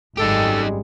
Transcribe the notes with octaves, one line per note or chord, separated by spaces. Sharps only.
G#1 F#2 G3 G#3 D#4 G4 A4